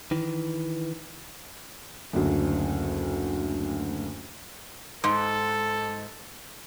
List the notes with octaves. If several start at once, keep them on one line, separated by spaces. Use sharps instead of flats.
D#3 E3
F#1 D2
G#2 A4